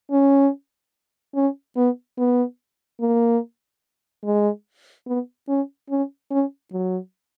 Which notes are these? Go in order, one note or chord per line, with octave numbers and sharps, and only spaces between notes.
C#4
C#4
B3
B3
A#3
G#3
B3
C#4
C#4
C#4
F#3